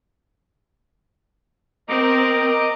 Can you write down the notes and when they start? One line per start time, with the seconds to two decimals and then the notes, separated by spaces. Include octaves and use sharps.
1.89 C4 A#4 D#5 A#5 D6